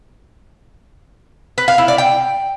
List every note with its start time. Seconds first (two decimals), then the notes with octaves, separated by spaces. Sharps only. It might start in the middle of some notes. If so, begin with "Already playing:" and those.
1.58 B4
1.68 F5
1.78 E4
1.88 D5
1.98 G5